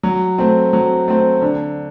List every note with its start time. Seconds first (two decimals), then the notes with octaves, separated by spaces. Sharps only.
0.03 F#3
0.38 A3 C4
0.73 F#3
1.08 A3 C4
1.42 D3